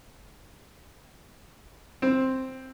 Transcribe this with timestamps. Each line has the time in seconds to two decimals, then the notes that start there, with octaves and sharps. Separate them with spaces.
2.02 C4